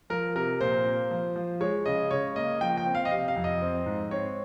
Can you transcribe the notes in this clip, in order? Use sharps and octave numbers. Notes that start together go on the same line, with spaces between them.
F3 A#4
C3 A#4
A#2 C5
A#3
F3
F3
G#3 C#5
C#3 D#5
C#3 C#5
A#3 D#5
F3 G5
G5
C4
F5
D#5
C3 F5
F5
F2
D#5
C4
G#2
C4 C#5